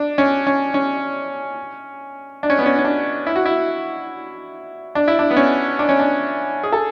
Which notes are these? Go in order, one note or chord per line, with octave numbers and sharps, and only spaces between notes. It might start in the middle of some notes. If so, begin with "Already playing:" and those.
Already playing: D4
C#4
C#4
C#4
D4
C#4
B3
C#4
C#4
D4
E4
F#4
E4
D4
E4
D4
B3
C#4
D4
C#4
D4
G#4
A4